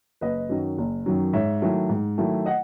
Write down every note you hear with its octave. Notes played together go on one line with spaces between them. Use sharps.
F#1 B4 D#5
F#2 D#3 F#3
F#1
F#2 D#3 F#3
G#2 C#5 E5
D#3 F#3 A3 E4
G#2
D#3 F#3 A3 E4
D#5 F#5